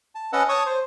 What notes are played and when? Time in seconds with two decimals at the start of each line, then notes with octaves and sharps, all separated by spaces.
0.15 A5
0.33 C#4 B4 D#5 F#5 A5 E6
0.49 C#5 A5 C#6 D#6
0.66 C5